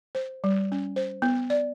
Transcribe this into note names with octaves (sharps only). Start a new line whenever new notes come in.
C5
G3
C#4
C5
B3
D5